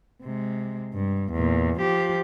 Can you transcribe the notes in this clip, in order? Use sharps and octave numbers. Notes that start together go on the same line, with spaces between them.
C3 G#3
G2
E2 A#2
F3 G4